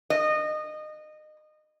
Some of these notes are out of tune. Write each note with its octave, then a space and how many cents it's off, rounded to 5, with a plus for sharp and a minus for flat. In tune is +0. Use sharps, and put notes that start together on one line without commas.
D#5 -25